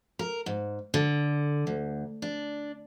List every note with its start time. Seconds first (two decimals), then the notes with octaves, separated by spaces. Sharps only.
0.19 A#4
0.46 G#2
0.94 D3
1.67 D2
2.22 D4